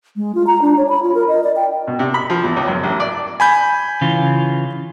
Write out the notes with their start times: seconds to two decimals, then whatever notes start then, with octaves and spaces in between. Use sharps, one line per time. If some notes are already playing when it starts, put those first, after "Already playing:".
0.16 G#3
0.35 F4
0.47 A#5
0.62 D4
0.78 C#5
0.89 B5
1.03 F4
1.15 A#4
1.28 D#5
1.44 D5
1.56 G5
1.87 B2
1.99 C3
2.14 B5
2.30 F3
2.43 E2
2.56 C#2
2.68 F#2
2.84 A1
3.00 D5
3.40 G#5 B5 G6
4.01 C#3 E3 F4